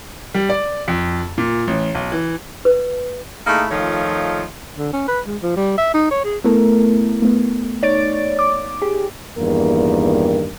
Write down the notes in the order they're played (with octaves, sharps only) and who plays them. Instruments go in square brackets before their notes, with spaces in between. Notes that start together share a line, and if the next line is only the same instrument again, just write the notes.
[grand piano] G3
D5
F2
A#2
A1
B1
E3
[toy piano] B4
[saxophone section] A3 A#3 D#4 E4 G#4
D#3 F3 A3 F4 C#5 D#5
[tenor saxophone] D3
C#4
B4
G#3
F3
G3
E5
D#4
C#5
G#4
[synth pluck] A3 B3 E4 A4 A#4
A3 B3
D#4 C#5 D5 A6 D7
D6
G4 G#4
[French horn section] E2 G2 D#3 A#3 A#4